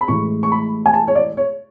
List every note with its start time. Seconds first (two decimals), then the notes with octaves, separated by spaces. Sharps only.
0.01 B5
0.08 A1 A2 E3 G#3 C#6
0.43 C#6
0.52 B5
0.86 G#5
0.94 A5
1.08 C#5
1.15 D5
1.37 C#5